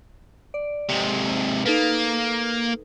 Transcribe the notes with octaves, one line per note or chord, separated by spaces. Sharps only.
D5
G#2 C3
A#3 D#4 A4 B4